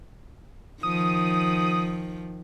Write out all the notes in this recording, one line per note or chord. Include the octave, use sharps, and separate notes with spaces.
D#3 F3 D#6